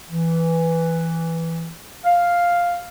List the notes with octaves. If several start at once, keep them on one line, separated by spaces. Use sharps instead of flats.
E3
F5